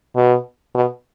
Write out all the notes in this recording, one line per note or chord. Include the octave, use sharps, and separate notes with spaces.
B2
B2